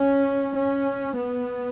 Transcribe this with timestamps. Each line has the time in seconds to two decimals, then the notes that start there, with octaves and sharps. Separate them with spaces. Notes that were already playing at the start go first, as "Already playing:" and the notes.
Already playing: C#4
0.55 C#4
1.16 B3